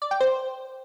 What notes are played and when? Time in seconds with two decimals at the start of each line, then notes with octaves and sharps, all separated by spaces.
0.02 D5
0.11 G5
0.20 C5